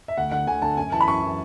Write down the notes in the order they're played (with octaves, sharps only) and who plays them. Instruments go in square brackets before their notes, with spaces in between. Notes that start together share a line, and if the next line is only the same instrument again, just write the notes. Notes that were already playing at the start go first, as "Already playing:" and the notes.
[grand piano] E5
D2 F#5
D3 F#5
D2 G#5
D3 A5
F#2 G#5
E3 A5
B5
F#2 C#6
E3